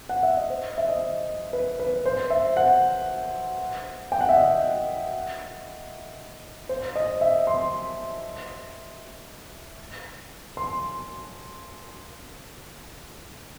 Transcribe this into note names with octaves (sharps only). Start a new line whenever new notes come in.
F#5
E5
D#5
C5
E5
D#5
B4
B4
C5
E5
F#5
G5
F#5
E5
D#5
C5
D#5
E5
C6
C6